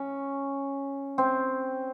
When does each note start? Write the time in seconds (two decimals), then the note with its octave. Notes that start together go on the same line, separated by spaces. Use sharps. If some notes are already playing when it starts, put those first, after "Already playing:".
Already playing: C#4
1.18 C4